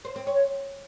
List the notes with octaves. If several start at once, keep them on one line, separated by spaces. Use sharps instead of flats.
C5
C4
C#5